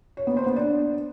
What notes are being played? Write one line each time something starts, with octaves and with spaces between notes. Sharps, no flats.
C#5
B3
C5
B3
D4